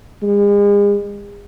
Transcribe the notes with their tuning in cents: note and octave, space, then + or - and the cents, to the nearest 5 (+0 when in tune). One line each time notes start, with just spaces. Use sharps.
G#3 -40